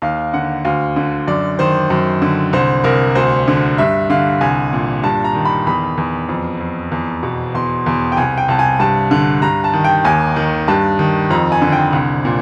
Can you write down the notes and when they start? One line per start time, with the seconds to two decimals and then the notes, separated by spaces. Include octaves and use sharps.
0.02 D#2 F5
0.34 D3 F#5
0.65 D2 F5
0.96 D3
1.28 F#2 D5
1.59 D#3 C5
1.90 F#2
2.22 D3
2.53 C2 C5
2.84 C2 A#4
3.15 D2 C5
3.48 D3
3.78 G2 E5
4.10 D3 F5
4.41 C2 G#5
4.73 A#2
5.03 G2 A5
5.24 A#5
5.35 D#3
5.45 B5
5.67 E2 B5
5.97 E2
6.29 F2
6.60 F2
6.92 E2
7.23 B2
7.54 E2 C6
7.86 E2
8.12 G5
8.17 C2 G#5
8.38 G5
8.48 C2 A5
8.59 G#5
8.80 G2 A5
9.11 D3
9.42 G2 A#5
9.64 A5
9.74 D#3
9.85 G5
10.05 D#2 G#5
10.36 D#3
10.68 G2 A5
10.99 D#3
11.31 F2 A#5
11.52 G#5
11.62 D3
11.72 G5
11.93 C2
12.25 A#2